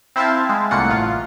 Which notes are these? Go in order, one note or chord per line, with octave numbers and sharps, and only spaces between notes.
C4 E4 C5 E5 F5 A5
G#3
C2 A3 A#3 F4 F#5 C#7
A1 F4